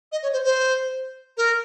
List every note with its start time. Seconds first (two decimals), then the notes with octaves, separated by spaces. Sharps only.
0.12 D#5
0.23 C#5
0.33 C5
0.44 C5
1.37 A#4